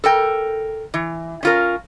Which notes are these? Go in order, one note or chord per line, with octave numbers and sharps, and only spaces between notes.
A4 A#4 G5
E3
C#4 F4 A#4